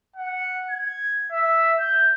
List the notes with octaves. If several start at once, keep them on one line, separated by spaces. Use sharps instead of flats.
F#5
G#6
E5
G6